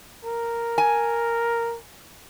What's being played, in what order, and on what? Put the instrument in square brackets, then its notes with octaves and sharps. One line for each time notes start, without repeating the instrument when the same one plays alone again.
[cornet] A#4
[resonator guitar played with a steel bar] G#5